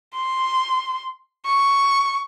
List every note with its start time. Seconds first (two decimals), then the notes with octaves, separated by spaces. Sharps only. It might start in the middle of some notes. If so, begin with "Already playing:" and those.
0.16 C6
1.46 C#6